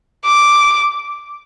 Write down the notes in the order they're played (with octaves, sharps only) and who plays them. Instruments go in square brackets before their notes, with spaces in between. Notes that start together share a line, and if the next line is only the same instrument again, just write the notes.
[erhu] D6